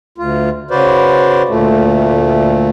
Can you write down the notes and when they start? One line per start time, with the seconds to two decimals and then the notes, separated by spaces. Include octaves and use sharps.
0.18 D2 F4
0.71 C#3 F#4 B4 C5 D5
1.49 D2 A#2 A3